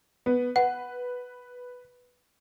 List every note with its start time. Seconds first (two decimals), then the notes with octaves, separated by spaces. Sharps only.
0.26 B3
0.56 B4 F#5